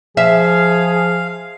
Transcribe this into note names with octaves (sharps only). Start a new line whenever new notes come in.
F3 G#4 E5 F5